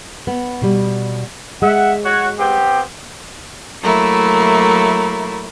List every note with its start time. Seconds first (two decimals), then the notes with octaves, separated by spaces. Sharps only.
0.27 B3
0.62 B2 G3
1.62 G#3 E5 F#5
2.05 F#4 C#5
2.39 B3 C4 G4
3.82 F#3 A3 A#3 E4